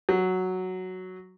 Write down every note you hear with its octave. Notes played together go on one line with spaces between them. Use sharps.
F#3